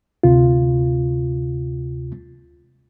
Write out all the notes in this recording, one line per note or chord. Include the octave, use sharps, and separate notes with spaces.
D2 C3 F4